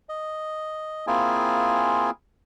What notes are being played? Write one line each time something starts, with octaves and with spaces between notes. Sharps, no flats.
D#5
A#3 C4 E4 F4 G#4 G#5